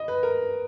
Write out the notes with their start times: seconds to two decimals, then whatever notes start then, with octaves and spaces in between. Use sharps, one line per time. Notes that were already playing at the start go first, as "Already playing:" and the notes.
Already playing: D#5
0.08 B4
0.23 A#4